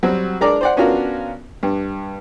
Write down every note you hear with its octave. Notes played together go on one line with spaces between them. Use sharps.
F#3 G3 C4 F#4
G#3 D4 A#4 D5 A#5 D6
C5 D5 F#5
B3 C#4 D4 F4 F#4 A#4
G2